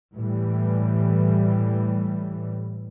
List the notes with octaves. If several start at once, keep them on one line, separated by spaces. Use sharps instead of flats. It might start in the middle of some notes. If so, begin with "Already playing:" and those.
A2 E3 G3